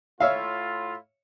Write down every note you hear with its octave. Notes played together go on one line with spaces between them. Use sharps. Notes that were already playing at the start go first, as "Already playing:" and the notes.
A2 E4 F4 C#5 E5 F5